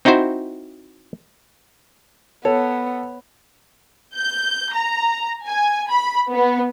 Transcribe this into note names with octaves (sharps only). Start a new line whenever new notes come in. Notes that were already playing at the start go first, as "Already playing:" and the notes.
C4 D#4 E4 F#4 C5
B3 A4 C#5
G6
A#5
G#5
B5
B3